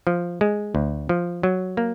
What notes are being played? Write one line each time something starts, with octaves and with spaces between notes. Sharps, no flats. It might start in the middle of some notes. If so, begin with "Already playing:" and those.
F3
G#3
D2
F3
F#3
A#3